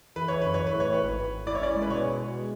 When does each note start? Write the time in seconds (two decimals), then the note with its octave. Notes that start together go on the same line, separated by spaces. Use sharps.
0.16 E3 B4
0.28 E3 C#5
0.42 F#2 B4
0.54 E3 C#5
0.67 B4
0.74 A2
0.80 C#5
0.89 A2 B4
1.03 G#1
1.18 G#1
1.32 G#1
1.46 E4 D5
1.55 C#5
1.61 C#4 D5
1.76 G#3
1.82 B4
1.90 B2 C#5